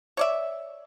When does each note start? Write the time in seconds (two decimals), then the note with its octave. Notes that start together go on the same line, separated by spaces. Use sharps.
0.17 C#5 D5 E5